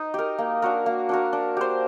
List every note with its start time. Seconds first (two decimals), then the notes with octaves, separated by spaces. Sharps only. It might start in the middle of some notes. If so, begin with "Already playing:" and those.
Already playing: D#4
0.14 G4 A#4
0.38 A#3
0.62 D4 F#4 A#4
0.86 A#3
1.09 D4 F#4 A#4
1.33 D4
1.57 G4 C5